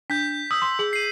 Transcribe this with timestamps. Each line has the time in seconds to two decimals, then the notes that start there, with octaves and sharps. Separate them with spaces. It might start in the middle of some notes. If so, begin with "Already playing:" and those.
0.10 D4 G6 B6
0.51 D#6 E6 G6
0.62 C6
0.79 G#4 F#7
0.93 C7 D#7